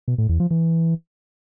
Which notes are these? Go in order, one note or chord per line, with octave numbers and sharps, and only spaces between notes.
B2
A2
E2
F3
E3